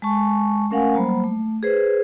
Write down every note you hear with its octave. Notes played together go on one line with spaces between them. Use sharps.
G#3 G#5 A5 C#6
A3 C#4 A#4 F5 F#5 G#5
F#3 G3 A#3 C5 B5
A3
G#4 B4 C5